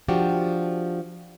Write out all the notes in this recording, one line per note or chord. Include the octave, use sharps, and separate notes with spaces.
F3 D4 F#4 G4